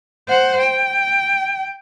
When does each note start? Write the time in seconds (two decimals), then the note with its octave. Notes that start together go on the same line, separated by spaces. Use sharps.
0.28 C5 F#5
0.60 G5